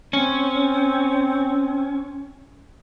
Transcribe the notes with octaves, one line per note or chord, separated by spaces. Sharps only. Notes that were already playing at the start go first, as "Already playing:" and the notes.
C4 C#4